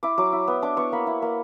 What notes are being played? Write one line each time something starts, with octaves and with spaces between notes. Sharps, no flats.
E4 D6
F#3 D6
E4
B3
D4 D6
B3 C#6
A#3 B5
E4
A#3